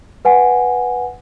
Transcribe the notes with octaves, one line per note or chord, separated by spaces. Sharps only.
B4 F#5 G#5